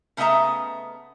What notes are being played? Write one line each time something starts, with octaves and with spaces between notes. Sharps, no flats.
C#3 A3 B3 D#5 E5 A#5